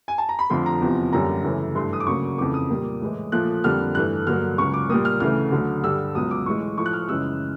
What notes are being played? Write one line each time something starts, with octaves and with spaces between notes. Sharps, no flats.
G#5
A5
A#5
B5
F2 D3 F3 A3 C6
A#5
E2 C3 F3
F#2 D3 G3 A#3 A#5
F#2 C#3 E3 A3
G2 E3 A3 C6
D#6
D6
D2 C#3 F#3 A#3 C#6
F2 C#3 E3 A3 D6
D#6
A#2 G3 A#3
A2 E3 G#3
A#2 F3 A3 F#6
F2 D3 G3 A#3 F6
G2 E3 A3 F#6
G2 D3 F#3 A#3 F6
C#2 C#3 F#3 C#6
D6
A#2 G3 A#3 D#6
F6
D2 C#3 E3 A3 F6
D2 D3 F#3
G2 D3 G3 E6
C#2 B2 F#3 D#6
D6
A2 E3 G#3 C#6
A2 F3 A3 C#6
F#6
F6
F#2 C#3 E3 G#3 E6